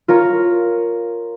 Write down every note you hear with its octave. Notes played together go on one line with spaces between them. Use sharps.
F4 A#4 C#5